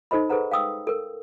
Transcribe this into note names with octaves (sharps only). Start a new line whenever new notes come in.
D#4 A4 C5 D#5 B5
G#4 A4 B4 C5 F#5 A#5
F5 G5 D#6 E6
A4 A#4